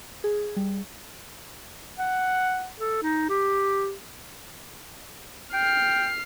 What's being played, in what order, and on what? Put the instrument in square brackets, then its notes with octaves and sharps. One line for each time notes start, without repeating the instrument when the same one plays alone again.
[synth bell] G#4
G3
[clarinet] F#5
A4
D#4
G4
[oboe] G5 [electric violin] F6 C7